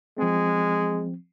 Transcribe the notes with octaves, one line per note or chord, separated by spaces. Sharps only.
F3 G#3 C4